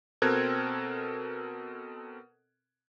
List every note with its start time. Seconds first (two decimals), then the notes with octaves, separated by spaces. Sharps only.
0.22 B2 C4 A4 A#4 F#6 G#6